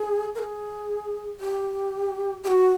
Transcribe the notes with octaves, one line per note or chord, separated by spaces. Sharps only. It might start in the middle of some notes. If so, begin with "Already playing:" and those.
Already playing: G#4
A#4
G#4
G4
G4
F#4